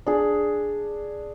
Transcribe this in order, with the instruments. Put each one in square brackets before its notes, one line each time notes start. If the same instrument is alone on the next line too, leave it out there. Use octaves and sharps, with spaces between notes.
[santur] D4 G#4